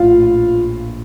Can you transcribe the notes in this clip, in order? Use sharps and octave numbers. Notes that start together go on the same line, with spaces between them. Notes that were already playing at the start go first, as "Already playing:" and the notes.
Already playing: A#1 A2 F4 F5